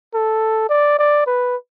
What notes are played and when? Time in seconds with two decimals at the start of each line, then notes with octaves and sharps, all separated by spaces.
0.14 A4
0.70 D5
0.99 D5
1.27 B4